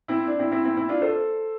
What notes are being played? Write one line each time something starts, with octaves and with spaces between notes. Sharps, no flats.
C4 E4
D4
C4 E4
C4 E4
C4 E4
C4 E4
D4 F4
A4 C5